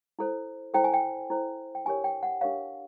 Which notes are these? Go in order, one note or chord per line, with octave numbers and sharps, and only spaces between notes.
E4 A4 C5
E4 A4 C5 G5
G#5
G5
E4 A4 C5
G5
D4 G4 A#4 C#5 G#5
G5
F#5
D4 G4 A#4 C#5 F5